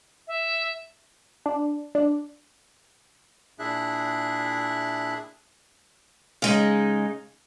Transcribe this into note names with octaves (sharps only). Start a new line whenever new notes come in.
E5
D4
D4
A#2 D4 E4 G#4 E5 F#6
C#3 G#3 D#4